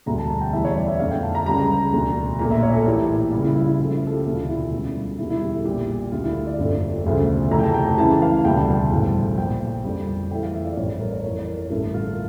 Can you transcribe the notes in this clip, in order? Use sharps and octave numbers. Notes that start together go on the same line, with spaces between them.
E1 D2 D3 G3 A#5
A5
A5
G5
E2 E3 G3 E5
C#5
D5
E5
F2 D3 A3 F5
G5
A5
A#5
C#2 C#3 G3 A#5
E1 D2 D3
A#1 A#2 A3 A#5
E5
C#5
A4
A#1 A2 E3 G4
C#2 C#3 G3 F4
E4
E4
E4
C#2 C#3 F3 A3
F4
A4
G4
E1 D2 D3 A3 F4
F4
E4
F4
C#2 C#3 G3
E1 E2 D3 G3 E4
E4
G4
A4
A#1 A#2 G3 G4
D2 D3 A3 F4
E4
F4
D5
G1 F2 D3 A3
E1 D2 C#3 F3 A3
F1 F2 E3 A3 A#5
G5
A5
G5
A5
C#2 C#3 E3 A5
F5
E1 D2 C#3 G3 G5
A5
G5
A1 G2 F3 A3
A#1 A#2 F3 G5
F2 D3 G3
F2 E3 A3 G5
F5
E5
D5
A1 G2 F3 A3 C#5
A#4
C#5
A#4
F2 E3 A3 C#5
C#5
A#4
A1 G2 D3 A3 A#4
A#4
F4